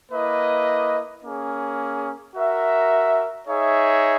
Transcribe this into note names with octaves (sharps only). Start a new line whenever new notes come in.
A#3 E4 B4 D#5
A#3 C#4 G#4
F#4 A#4 E5
D#4 G#4 C#5 E5